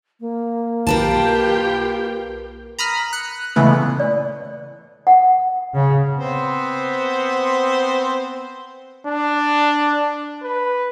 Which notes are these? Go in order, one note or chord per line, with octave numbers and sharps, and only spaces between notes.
A#3
B1 F4 G4 A#4 B4 G5 A5
A#5 B5 D#6 F6
F#6 C#7
A#2 C#3 E3 G#3 A3 B3
D5
F#5
C#3
B3 C4 C5
D4
B4